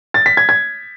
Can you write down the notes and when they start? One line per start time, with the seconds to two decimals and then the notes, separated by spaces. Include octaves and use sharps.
0.14 A6
0.26 B6
0.37 G#6
0.49 G#6